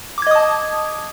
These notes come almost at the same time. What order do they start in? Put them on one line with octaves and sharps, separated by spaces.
D6 G#6 D#5 D#6 A5